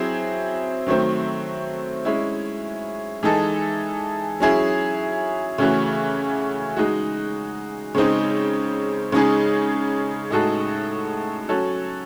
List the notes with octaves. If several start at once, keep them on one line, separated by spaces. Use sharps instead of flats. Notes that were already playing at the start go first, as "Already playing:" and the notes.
Already playing: F#3 C4 E4 G#4
D#3 F#3 A3 C4
G#3 C#4 E4
E3 G#3 D#4 A4
F#3 C#4 E4 G#4
C#3 E3 A3 C#4 F#4
G#3 D#4 F#4
C#3 G#3 C4 D#4
C#3 G#3 D#4 G#4
A2 G#3 D#4 F#4 A4
F#3 C#4 F#4 A4